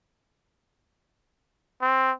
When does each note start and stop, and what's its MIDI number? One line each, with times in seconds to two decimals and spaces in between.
1.82 2.12 60